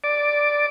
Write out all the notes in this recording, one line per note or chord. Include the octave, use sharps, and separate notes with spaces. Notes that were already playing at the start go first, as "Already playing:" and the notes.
D5